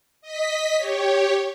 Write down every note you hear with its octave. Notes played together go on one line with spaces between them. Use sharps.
D#5 B6
G4 C#5